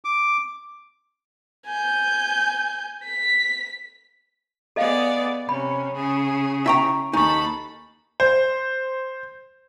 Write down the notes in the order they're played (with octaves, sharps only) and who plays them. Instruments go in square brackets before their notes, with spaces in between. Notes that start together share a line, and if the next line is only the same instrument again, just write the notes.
[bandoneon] D6
[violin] G#5 G6
B6
[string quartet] B3 G#4 D5 [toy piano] A4 D#5 F5
[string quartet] C3 C#4 [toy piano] B5
[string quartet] C#3 G#4
[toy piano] E4 C#6 [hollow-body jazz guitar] E5 G5 A#5
[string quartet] D#2 A4 B5 [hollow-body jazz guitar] D#4 [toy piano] G#5 C#6
[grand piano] C5